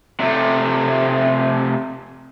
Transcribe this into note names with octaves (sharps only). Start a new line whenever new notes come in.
C3 A3